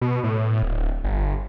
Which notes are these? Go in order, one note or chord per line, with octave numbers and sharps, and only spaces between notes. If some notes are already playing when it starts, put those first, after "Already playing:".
B2
A2
D1
G1